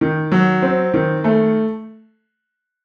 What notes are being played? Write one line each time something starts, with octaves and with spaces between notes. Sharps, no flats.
D#3
F#3
C4
D#3
A3